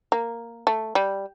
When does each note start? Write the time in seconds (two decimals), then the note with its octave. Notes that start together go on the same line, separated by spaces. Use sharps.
0.12 A#3
0.67 A3
0.95 G3